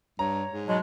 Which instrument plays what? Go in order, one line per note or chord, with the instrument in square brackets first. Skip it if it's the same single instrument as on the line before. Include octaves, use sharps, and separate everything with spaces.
[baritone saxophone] G2 [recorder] C#5 [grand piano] A#5
[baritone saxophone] G#2
[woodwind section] B2 F#3 G#3 [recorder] C#5